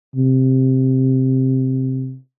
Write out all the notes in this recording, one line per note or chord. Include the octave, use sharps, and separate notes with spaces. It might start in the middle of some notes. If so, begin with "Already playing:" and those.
C3